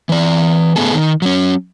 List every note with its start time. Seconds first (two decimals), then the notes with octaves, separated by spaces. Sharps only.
0.09 E3 D5
0.76 A2 B3 G#4 A4
0.95 D#3
1.22 F#3 C#4